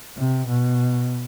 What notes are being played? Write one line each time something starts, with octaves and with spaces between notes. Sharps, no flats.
C3
B2